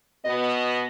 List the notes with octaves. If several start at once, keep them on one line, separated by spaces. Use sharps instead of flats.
B2 B3 D#5